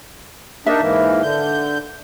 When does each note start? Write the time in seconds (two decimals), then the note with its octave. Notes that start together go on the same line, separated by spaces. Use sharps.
0.67 A#3 D4 D#4 E5
0.81 G#2 E3 A#3
1.23 D3 G6